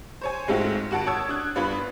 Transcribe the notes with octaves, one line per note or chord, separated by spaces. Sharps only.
C5 C#5 G#5
G#2 G#3 A3 C4 F4 F#4
G#1 F#4 F#5 A5 D7
C#5 A5 D#6 E6 G#6
D4 D#6 F#6
G2 B3 D4 F4 B5